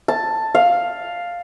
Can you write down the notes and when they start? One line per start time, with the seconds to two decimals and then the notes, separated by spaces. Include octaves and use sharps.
0.08 A5
0.55 F5